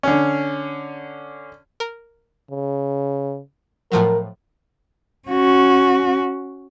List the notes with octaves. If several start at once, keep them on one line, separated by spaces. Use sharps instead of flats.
D3 C#4
A#4
C#3
A2 F3 F#3 A#4
C#4 F#4